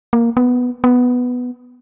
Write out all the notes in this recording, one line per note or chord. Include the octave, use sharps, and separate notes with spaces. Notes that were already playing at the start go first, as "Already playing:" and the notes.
A#3
B3
B3